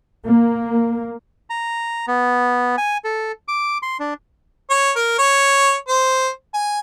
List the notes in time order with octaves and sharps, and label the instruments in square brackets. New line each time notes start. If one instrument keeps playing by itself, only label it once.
[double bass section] A#3
[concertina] A#5
B3
G#5
A4
D6
C6
D4
[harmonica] C#5
A#4
C#5
C5
G#5